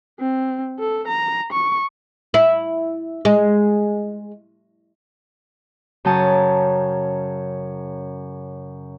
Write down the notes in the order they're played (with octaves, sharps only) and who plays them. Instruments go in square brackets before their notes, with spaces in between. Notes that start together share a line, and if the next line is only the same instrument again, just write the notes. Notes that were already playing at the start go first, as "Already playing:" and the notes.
[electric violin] C4
A4
A#5
C#6
[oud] E4
G#3
[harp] F#2 C#3 G5 A5 A#5 D#6